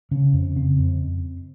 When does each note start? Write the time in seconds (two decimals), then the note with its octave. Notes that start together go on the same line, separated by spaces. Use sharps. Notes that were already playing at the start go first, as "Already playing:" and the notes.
0.11 C#3 C#4
0.33 F2
0.56 C#3 C4
0.78 F2